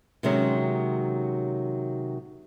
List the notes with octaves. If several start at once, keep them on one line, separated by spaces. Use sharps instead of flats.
C3 D#3 F#3 G#3 C#4